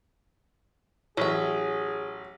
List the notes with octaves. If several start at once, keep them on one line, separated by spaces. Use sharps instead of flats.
A1 F#3 G#4 E5